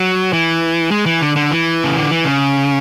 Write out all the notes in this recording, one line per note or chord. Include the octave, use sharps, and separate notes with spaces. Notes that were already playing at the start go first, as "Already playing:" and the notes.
Already playing: F#3
E3
G#3
E3
D3
D3
E3
C#3
D3
E3
C#3